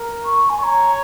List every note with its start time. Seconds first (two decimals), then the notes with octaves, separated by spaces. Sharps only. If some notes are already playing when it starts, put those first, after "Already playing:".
Already playing: A#4
0.25 C#6
0.49 G#5
0.60 C#5 A#5 C#6